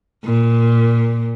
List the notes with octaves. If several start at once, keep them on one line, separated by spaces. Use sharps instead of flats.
A#2